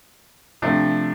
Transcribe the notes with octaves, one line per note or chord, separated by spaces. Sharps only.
C3 F3 A3 D4